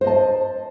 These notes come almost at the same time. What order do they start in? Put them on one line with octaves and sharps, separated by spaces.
C5 D#5 A5